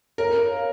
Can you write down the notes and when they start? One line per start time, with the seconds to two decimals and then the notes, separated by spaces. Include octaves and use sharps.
0.18 A#4 C#5
0.35 C#5
0.51 F5